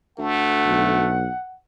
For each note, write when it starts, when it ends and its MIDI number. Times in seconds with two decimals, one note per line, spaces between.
0.19 1.24 38
0.19 1.17 57
0.19 1.57 78
0.66 1.27 35